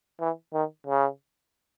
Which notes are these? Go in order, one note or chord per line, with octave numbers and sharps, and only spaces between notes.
E3
D#3
C#3